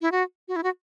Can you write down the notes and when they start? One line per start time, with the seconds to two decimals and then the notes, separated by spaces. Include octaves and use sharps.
0.02 E4
0.12 F#4
0.48 F#4
0.56 E4
0.63 F#4